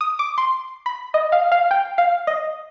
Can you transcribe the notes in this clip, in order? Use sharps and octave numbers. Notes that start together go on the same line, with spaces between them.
D#6
D6
C6
B5
D#5
F5
F5
G5
F5
D#5